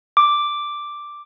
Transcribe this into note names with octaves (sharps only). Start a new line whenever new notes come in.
D6